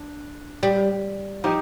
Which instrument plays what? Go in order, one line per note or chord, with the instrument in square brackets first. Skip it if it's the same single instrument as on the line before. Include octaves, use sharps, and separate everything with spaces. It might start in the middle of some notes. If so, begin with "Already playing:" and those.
Already playing: [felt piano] D4
[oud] G3
[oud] F3 [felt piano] D#4 G4